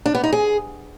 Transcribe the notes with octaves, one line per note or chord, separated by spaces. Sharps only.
D4
B3
D#4
G#4